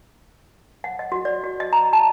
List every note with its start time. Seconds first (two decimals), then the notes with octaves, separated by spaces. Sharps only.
0.84 F#5
0.99 D#5
1.12 F#4
1.25 D5
1.44 F#4
1.60 D#5
1.73 A#5
1.93 A5